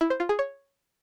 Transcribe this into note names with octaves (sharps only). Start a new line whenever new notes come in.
E4
C5
F4
G#4
C#5